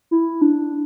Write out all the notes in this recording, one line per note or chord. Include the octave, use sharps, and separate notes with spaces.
E4
D4